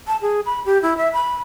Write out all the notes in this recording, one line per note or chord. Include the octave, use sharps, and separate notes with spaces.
A5
G#4
B5
G4
E4
E5
B5